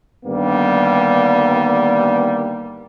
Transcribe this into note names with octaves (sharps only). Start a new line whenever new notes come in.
G2 D3 D#3 G3 A#3 B3